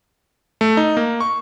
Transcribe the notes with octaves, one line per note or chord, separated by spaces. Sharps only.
A3
D#4
A#3
C#6